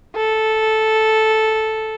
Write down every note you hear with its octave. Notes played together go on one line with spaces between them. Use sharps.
A4